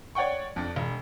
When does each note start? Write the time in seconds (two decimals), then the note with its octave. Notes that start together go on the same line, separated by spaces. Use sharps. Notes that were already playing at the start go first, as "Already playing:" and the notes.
0.15 C#5 D5 F#5 G5 C#6
0.56 F2 D4
0.76 E1